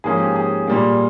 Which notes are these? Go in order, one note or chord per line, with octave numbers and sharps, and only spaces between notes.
G#2 F3 A#3 C#4 G#4
G4
G#4
A#2 G3 A#3